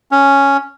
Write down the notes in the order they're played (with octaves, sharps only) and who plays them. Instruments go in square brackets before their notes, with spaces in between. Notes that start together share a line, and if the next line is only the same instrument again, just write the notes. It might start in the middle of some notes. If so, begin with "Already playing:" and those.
[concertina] C#4